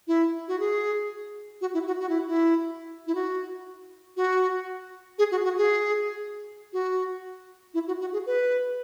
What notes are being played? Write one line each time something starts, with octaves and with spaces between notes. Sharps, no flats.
E4
F#4
G#4
F#4
E4
F#4
F#4
E4
E4
E4
F#4
F#4
G#4
F#4
F#4
G#4
F#4
E4
F#4
F#4
G#4
B4